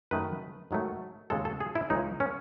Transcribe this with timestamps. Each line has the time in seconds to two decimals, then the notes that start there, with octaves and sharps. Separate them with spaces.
0.11 F#2 D#3 A3 B4
0.71 G#2 D#3 F#3 A3
1.30 D#2 C#3 G#3 A4
1.45 A4
1.60 G#4
1.75 E4
1.90 C#2 C#3 E3 G#3 D#4
2.20 C#4